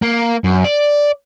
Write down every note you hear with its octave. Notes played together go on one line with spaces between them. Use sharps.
A#3
F#2
D5